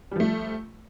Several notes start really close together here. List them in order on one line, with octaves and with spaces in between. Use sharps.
G3 F3 A3